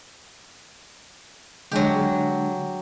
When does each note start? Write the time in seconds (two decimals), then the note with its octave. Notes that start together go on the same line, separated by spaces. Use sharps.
1.72 D3 F#3 G#3 D4 G4